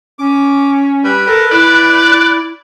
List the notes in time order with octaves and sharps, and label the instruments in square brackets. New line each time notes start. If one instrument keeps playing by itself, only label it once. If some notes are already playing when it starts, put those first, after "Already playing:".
[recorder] C#4 [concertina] D6
[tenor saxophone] G3 [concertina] B4
[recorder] A4 [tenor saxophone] A#4
[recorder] E4 [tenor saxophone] D5 [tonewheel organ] F#6